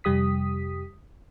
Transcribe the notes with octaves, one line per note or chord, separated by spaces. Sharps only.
F2 C3 G3 G4 D#6 B6